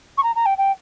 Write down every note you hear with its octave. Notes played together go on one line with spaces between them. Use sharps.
C#6
A#5
A#5
G5
G5